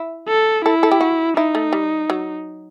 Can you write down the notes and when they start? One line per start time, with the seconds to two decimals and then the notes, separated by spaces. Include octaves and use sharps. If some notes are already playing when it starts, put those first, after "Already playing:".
Already playing: E4
0.29 A4
0.65 E4 A4
0.83 A4
0.91 G4
1.01 F#4
1.37 D#4 E4
1.55 A3
1.73 G3
2.10 F#3